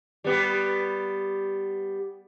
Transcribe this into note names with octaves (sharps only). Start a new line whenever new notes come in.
G3 B3 G4